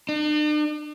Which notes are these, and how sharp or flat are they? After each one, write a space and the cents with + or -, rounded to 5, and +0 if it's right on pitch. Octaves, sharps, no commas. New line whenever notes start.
D4 +45